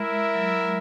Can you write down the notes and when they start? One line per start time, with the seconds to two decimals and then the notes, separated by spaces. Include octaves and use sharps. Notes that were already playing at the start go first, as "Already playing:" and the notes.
Already playing: G#3 E4 A#4 E5
0.12 G#3
0.35 F#3
0.59 G#3